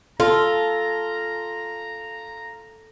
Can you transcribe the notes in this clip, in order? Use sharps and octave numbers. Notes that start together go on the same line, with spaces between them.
F4 A4 A#5